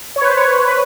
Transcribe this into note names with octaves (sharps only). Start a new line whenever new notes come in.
C#5
B4
C5
C#5
B4
B4